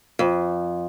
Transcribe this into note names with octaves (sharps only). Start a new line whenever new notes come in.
F2